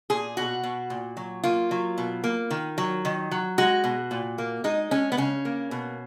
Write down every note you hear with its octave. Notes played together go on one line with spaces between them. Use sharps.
A#2 G#4
B2 F#4
B2
A#2
F#3
A#3 F4
F#3
B2
A#3
D#3
F#3
D#3
F#3
G#3 F#4
B2
A#2
A#3
G#3 D#4
G#3 C#4
B3
C#3 C#4
A#3
B2